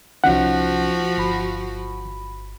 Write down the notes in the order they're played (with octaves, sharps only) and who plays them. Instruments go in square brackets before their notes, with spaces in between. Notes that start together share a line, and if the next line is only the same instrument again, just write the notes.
[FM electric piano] C2 C#4 D#4 [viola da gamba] F3 F#4 [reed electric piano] F#5
[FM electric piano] G1 B5